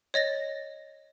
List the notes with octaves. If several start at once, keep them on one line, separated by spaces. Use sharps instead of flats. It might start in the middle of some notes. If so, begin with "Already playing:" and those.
C#5 D#5 A6 A#6